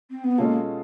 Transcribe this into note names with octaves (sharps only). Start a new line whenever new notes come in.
C4
B3
B2 G#3 A#3 C#4 F4 A4